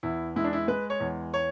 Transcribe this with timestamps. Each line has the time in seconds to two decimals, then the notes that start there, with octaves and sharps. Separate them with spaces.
0.03 E2 E4
0.36 G#3 E4
0.44 D4
0.53 E4
0.68 G#3 B4
0.90 C#5
1.00 E2
1.34 C#5